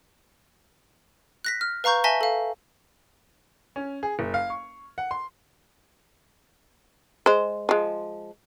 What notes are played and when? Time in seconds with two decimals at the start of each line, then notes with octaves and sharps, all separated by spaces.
1.45 F#6 A#6 B6
1.61 F6
1.84 B4 F5 A#5 C#6 G6
2.04 E5 G#5 A5 A#6 B6 G7
2.21 A4 F5
3.76 C#4
4.03 G#4
4.19 F#1
4.34 F5
4.50 C#6
4.98 F#5
5.11 C6
7.26 G#3 C5
7.69 F3 G#3